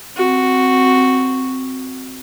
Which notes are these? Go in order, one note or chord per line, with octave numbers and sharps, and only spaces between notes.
C4 F#4